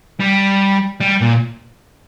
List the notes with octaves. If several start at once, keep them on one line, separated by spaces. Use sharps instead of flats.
G3
G3
A#2